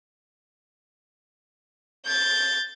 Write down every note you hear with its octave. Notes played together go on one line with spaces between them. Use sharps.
G6 A6